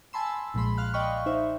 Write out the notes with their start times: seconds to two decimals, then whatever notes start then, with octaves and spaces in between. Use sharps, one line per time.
0.13 G#5 A5 B5 C6 E6
0.54 B1 A#2 F3 G#3 B5 C6
0.78 F5 F6 F#6
0.94 D5 D#5 F5 G5 B5 C#6
1.26 D#4 C5 E5